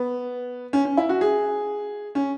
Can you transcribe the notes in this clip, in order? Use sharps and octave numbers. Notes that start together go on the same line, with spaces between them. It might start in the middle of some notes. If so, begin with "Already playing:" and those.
Already playing: B3
C#4
C#4
E4
F#4
G#4
C#4